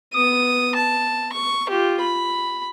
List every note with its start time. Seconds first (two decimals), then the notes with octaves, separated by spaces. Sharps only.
0.14 B3 D#6
0.75 A5
1.33 C#6
1.69 F4 G4
2.00 B5